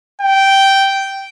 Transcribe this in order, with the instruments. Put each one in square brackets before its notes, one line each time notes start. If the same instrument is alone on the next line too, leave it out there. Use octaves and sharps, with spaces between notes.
[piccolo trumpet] G5